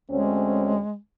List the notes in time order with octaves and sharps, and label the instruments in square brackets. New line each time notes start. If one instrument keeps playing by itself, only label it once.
[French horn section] D2 C4 C#4 [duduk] G#3